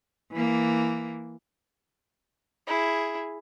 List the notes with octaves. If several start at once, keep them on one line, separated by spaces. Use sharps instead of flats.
E3 A#3
E4 G#4